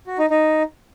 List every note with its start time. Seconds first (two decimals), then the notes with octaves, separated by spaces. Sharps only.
0.07 F#4
0.18 D#4
0.30 D#4